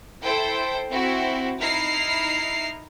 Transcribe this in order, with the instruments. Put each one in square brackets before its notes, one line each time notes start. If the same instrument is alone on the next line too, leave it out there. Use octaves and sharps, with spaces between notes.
[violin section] E4 A4 C5 G5
C4 E4 F#4
D#4 E4 F6 C7